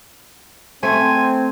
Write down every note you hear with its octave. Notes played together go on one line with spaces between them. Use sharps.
A3 C4 C5 G#5